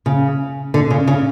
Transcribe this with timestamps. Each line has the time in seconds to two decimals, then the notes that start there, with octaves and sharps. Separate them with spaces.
0.06 C#3
0.74 D3
0.90 C#3
1.07 C#3